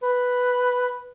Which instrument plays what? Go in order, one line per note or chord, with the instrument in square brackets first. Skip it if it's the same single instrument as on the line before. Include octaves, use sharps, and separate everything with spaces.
[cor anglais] B4